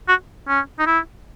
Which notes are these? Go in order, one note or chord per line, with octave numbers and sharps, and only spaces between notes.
F#4
C#4
D#4
E4